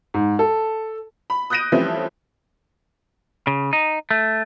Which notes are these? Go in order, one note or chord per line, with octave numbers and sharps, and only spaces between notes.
G#2
A4
B5
D#6 F#6 G6 A#6 D7 D#7
E3 F3 G3 A3 C4 C#4
C#3
D#4
A3